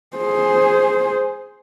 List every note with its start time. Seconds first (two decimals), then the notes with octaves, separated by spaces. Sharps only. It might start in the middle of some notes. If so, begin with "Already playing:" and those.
0.17 G#4 C5